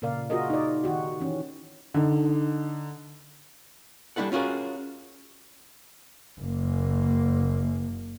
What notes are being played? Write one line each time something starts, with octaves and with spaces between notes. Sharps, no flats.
A#2 C#3 A#4 D5 F5
F4 F#4 G#4 A#4 D#5
D#4 D5
D#3 D#4 F#4 G4
E3 C#4
D3 D#4
G3 D4 E4 A4 F#5
C#4 F4 F#4 G#4 A#4
F#1 A#3